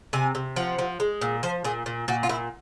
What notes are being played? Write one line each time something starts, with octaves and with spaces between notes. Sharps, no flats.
C3 G#5
C3
F3 F#5
F3
G#3
A#2
F3 C5
A#2 G#4
A#2
A#2 F#4
F4
A#2 E4